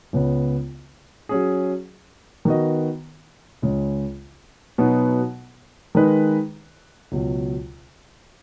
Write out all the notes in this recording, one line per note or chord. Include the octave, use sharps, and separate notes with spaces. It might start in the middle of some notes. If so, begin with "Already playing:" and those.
C#2 C#3 B3
F#3 C#4 G#4
D#3 B3 F#4 D#5
C#2 C#3 G#3
B2 F#3 B3 D#4
D#3 G#3 D#4 B4
C#2 B2 F#3